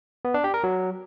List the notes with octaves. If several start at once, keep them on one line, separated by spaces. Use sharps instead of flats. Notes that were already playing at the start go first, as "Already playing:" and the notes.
B3
D4
G4
A#4
F#3